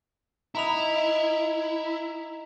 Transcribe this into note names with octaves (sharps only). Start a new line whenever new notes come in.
D#4 E4 F#5 A#5 B5 D#6 F7